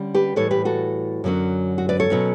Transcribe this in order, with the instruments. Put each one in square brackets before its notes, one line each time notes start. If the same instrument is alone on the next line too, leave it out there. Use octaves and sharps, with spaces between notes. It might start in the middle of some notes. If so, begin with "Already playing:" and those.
Already playing: [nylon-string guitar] D3 G3 C#4
G4 B4
A2 E3 G3 A4 C#5
G4 B4
F#4 A4
F#2 D3 F#3 C#4
F#4
B4 D5
A4 C#5
B2 F#3 C#4